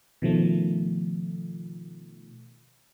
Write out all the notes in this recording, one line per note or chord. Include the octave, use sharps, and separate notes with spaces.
B2 D#3 F3 A3